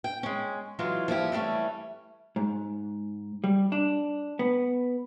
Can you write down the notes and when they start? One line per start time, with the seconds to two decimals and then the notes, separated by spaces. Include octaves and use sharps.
0.04 G5
0.23 G#3 C#4
0.79 E3 F#3 G#3 F4
1.08 F3 G3 E4 G4
1.32 E3 G3 A3 C#4
2.36 G#2
3.44 G3
3.72 D4
4.39 B3